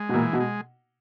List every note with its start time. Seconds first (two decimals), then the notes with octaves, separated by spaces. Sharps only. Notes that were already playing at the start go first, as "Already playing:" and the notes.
Already playing: G#3
0.09 B2
0.13 A#2 E3
0.33 B2
0.40 G#3